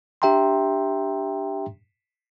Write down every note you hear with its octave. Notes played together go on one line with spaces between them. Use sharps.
D4 G4 E5 G5 A#5 C6